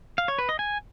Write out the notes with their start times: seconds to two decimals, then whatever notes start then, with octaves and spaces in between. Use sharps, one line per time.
0.18 F5
0.28 C#5
0.39 B4
0.49 D#5
0.59 G#5